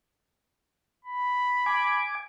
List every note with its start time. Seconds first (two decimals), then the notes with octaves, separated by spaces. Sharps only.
1.05 B5
1.66 G#5 D6